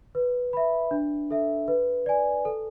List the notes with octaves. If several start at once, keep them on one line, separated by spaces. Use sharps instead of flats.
B4
E5 B5
D4
A4 E5
B4
D5 G#5
A4